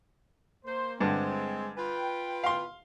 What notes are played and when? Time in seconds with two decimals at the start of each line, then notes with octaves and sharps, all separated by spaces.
0.65 A#3 C5
1.01 G2 D3 G#3 C4
1.77 F4 B4 G5
2.43 F5 C6